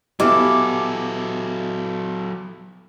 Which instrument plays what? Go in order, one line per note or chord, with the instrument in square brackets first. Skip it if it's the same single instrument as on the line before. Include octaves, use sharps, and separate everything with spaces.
[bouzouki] E3 F5 [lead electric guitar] F#3 A4 [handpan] B3 E4 G4 [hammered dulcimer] D6